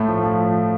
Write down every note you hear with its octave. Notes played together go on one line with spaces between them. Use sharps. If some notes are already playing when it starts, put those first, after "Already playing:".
Already playing: A2 A3
F3
F3